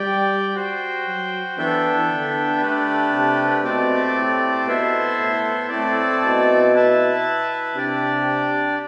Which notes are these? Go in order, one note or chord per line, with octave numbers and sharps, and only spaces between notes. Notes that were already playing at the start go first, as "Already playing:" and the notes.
Already playing: G3 G4 D5 G5
F#4 C5 G5
F#3
E3 B3 D4 A4 E5 G5
D3
A3 D4 G4 B4
C3
B2 A3 C4 G4 D5
A2
B2 B3 E4 A4 C5 E5
A2
A2 A3 C4 E4 A4 D5
B2
E4 B4 E5 A5
C3 D4 G4 D5